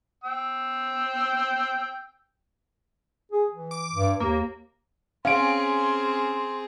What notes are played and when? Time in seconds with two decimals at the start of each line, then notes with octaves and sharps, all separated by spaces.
0.24 G5 E6
3.31 G#4
3.50 E3
3.71 D6
3.93 G2
4.20 D#2 A#3
5.25 C4 C#4 G#4 F5 C6 D7